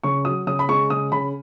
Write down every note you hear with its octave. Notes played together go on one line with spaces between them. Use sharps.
C#3 C#6
F#3 D#6
C#3 D#6
B5
G#3 C#6
C#3 D#6
C#3 B5